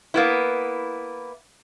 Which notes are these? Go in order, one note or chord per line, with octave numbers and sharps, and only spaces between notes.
A#3 B3 E4